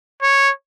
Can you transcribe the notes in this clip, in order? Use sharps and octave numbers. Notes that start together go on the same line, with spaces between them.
C#5